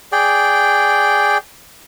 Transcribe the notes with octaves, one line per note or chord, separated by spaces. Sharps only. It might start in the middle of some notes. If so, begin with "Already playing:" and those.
G#4 D5 G5